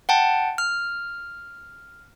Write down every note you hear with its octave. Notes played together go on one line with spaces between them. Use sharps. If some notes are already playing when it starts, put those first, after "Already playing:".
F#5 G5 A5
F6